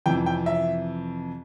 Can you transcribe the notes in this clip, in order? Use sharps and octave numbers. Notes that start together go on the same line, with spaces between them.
F2 C3 E3 G5
G5
E5